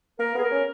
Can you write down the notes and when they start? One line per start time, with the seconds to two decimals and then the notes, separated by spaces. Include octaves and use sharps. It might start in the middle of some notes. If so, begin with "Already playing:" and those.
0.19 A#3 A#4
0.35 B3 G#4
0.43 A#4
0.51 C#4